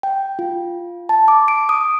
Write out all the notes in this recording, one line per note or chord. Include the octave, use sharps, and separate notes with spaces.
G5
F4
A5
D6
D7
D#6